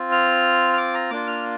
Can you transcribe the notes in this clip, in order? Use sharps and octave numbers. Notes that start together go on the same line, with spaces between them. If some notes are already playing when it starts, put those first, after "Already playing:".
Already playing: C4 F4
F6
F6
D6
A#5
A#3 D4 F4 D6
F6